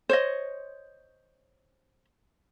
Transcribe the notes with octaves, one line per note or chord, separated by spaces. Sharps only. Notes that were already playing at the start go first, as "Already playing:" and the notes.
C5 C#5 D#5